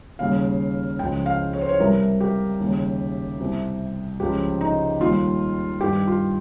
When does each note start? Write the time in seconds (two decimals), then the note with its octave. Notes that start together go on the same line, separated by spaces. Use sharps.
0.19 D#2 C#3 G3 F5
0.99 C#2 C#3 F3 G5
1.26 F5
1.53 C#5
1.61 C5
1.69 C#5
1.80 C2 C3 G3 A#4
2.20 G4
2.60 D#2 C#3 G3
3.40 C2 C3 G3
4.20 C#2 C#3 F3 G4
4.61 D#4
5.00 D#2 D#3 G3 F4
5.80 G2 D#3 G3 G4
6.08 F4